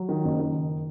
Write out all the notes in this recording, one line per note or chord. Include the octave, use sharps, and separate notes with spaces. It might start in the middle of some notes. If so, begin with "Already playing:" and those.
Already playing: F#3
D#3
F#1
D#3